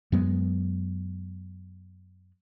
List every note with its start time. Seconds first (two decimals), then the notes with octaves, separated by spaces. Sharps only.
0.12 F#2 F#3 G#3 B3